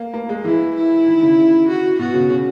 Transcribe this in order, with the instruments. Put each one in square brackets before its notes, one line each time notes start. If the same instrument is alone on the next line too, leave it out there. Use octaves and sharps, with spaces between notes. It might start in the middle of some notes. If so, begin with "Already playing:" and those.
Already playing: [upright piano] A#3
A#3
G#3
[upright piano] E3 [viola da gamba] E4
[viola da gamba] E4
[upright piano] D#3
C#3
[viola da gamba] F#4
[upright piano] B2 [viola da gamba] F#4
[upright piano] C#3
C#3